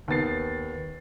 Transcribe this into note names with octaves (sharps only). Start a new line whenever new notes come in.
D#2 B3 A6 C7